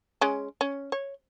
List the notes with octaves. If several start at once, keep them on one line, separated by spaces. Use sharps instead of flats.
G#3 C#4
C#4
C#5